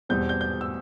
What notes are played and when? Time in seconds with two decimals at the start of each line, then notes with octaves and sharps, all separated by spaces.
0.09 E2 B2 G3 C4 G6
0.29 G6
0.41 G6
0.61 E6